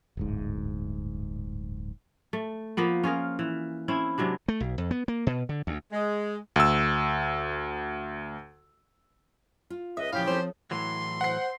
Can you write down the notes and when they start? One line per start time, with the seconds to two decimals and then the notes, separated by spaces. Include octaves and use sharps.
0.17 D1 G1 G#2
2.33 A3
2.77 F3 A#3 B3
3.04 C#4 F4 G#4 A#4
3.39 E3
3.88 C4 C#4 E4
4.18 C3 F#3 G#3 D4
4.48 A3
4.60 B1
4.78 F2
4.91 B3
5.08 A#3
5.27 B2
5.49 D3
5.67 D2
5.91 G#3
6.56 D2 E6
9.70 F4
9.97 C#2 B4 D#5 E5 D#6
10.13 A#2 C#3 F3 C#4 E4 G4 F5
10.28 F3 C4 A4 C5 C#5
10.71 A2 E3 F#3 C6
11.21 C5 F#5 C7